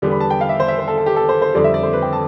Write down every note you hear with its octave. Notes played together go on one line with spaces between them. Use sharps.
E2 D3 G3 B3
B5
A5
G5
F5
E5
C5
E5
C5
A4
A4
G4
A4
C5
C5
F2 D3 G3 C4 D5
E5
D5
C5
B4
G5
A5